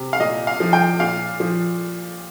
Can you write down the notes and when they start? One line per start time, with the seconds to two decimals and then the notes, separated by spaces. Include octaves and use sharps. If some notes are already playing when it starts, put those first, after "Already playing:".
Already playing: C3
0.13 F5
0.20 A#2 D#5
0.47 F5
0.60 F3
0.73 G5
1.00 A#2 F5
1.40 F3